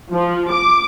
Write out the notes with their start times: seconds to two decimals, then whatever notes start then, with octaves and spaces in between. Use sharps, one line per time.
0.11 F3
0.51 D6